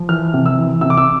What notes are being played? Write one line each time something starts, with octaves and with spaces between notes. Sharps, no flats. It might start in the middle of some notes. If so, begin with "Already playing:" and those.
Already playing: F3
E3 F6
C3
E6
E3
C3 E6
D6
E6